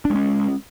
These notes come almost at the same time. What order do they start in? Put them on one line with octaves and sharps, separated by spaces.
D4 G#3 C#4